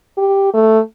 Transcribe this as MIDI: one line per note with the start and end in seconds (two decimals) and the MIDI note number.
0.18 0.53 67
0.54 0.80 57